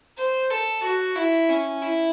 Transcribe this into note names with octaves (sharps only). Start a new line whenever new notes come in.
C5
A4
F#4
E4
C#4
E4